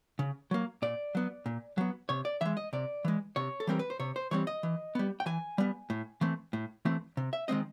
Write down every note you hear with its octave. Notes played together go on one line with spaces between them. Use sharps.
C#3
F#3 A#3
A#2 D5
F#3 B3
A#2
F#3 B3
C3 C#5
D5
E3 G#3 E5
D#5
C3 D5
E3 G#3
C3 C#5
A4
E3 G3 C4 A#4
B4
C5
C3 C#5
C5
E3 G3 C4 C#5
D#5
E3
G3 B3
G5
E3 G#5
G3 B3
A2
E3 A3 C4
A2
E3 A3 C4
C3
E5
D#3 G#3 C4 D#5